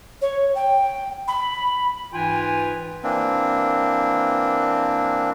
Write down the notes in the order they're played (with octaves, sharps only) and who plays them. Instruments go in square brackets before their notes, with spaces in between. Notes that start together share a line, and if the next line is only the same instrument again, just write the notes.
[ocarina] C#5
G5
B5
[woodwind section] G#2 E3 F4 B4 G5 G#5
[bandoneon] E3 A#3 C4 D4